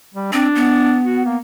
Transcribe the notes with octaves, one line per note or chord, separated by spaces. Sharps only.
G3
C4 D4
B3
F#4
A#3